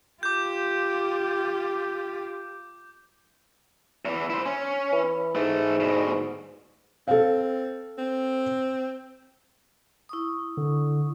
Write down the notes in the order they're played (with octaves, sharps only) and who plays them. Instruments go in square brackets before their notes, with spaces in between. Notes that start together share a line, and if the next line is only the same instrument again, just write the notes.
[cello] F4 G4 [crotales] D6 G6
[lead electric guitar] E2 E3
E4 C5
C#4
[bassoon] E3
[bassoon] G#2 [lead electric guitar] E3 A3
[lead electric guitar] D2 B2
[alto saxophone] C4 [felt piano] A4 F5
[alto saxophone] C4
[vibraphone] E4 C#6 D#6
[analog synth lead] D3